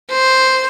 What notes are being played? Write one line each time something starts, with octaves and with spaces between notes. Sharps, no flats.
C5